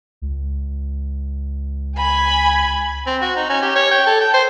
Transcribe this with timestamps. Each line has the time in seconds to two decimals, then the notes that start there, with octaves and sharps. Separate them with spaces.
0.22 C#2
1.97 G#5 B5 G#6
3.06 C4
3.21 F#4
3.36 D#4
3.49 C#4
3.62 G4
3.76 C#5
3.91 G5
4.07 A4
4.21 G5
4.34 C5